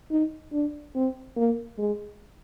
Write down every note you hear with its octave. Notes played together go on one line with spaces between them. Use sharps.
D#4
D4
C4
A#3
G#3